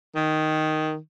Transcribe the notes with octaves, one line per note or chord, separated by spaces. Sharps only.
D#3